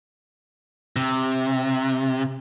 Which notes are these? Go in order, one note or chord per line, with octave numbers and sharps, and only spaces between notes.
C3